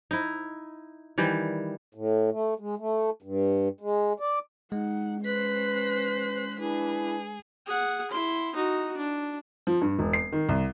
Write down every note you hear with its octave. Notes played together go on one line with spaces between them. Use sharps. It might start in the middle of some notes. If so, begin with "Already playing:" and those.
D#4 E4
D#3 E3 G3
A2
A3
G#3
A3
G2
G#3
D5
G#3 D#4 F#5
C#4 B4 C5 F#6 B6
D4 E4 G#4 B4
G#4 F#5
E4 C6
D#4 F#4
D4
F3
G2
E1
C7
D#3
C2